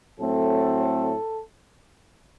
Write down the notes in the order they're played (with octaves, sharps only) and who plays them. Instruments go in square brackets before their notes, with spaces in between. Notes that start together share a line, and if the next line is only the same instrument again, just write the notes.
[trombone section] A2 F#3 A3 C4 A4